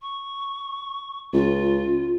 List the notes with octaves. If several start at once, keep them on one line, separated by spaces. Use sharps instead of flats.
C#6
C#2 F4